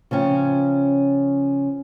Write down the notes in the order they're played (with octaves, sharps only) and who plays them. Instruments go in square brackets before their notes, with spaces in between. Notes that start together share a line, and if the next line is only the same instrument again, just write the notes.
[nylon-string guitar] C#3 F3 C#4 G5